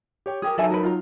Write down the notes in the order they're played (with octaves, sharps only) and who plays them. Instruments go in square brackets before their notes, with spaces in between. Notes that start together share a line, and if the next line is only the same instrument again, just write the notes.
[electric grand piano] G4 C#5 G5
[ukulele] G4 G#4 [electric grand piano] A#4 D#6
[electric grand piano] F#3 D#4 [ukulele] A4 E5 G#5
[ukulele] F#4 A#4 B4
F4 A#5